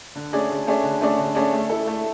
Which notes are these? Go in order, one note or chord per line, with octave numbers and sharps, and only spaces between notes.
D3
A3 C#4 G#4 D5
D3
A3 C#4 G#4 D5
D3
A3 C#4 G#4 D5
D3
A3 C#4 G#4 D5
A3
E4 A4
A3